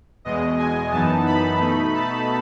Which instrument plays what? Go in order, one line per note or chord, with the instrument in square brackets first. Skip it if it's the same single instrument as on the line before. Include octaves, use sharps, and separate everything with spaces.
[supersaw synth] E2 B2 G#3 D#5
G#5
F#2 E3 B3 D#4 A5
B5
B2 A3 D#4
A5